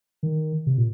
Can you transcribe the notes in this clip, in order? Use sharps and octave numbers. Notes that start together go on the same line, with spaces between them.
D#3
C3
A#2